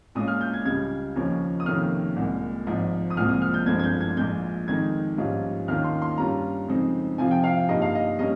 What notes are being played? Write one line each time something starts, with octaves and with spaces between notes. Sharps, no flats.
A#2 G#3 C#4 F4 D#6
F6
G6
G#6
C#2 C#3 G3 G#6
D#2 C#3 F3 A#3 C#4
D#6
F2 C3 D#3 A#3 C#4 F6
C2 A#2 G#3
G#1 G#2 F3
D#6
C2 A#2 F3 G#3 C4 F6
D#6
F6
G6
G1 G2 F3 G#3 C4 G#6
G#6
G6
G#6
A#1 A#2 G#3 G6
F2 D#3 G#3 D#4 G#6
A#1 G#2 G3 C#4 F4
D#2 D#3 A#3 C#4 F4 F6
C6
C6
G2 G3 C#4 F4 A#5
F2 C#3 G#3 C4 D#4
F2 C3 F3 C4 F4 G#5
G5
F5
G2 G3 A#3 D#4 D#5
F5
D#5
G3 A#3 C#4 D#5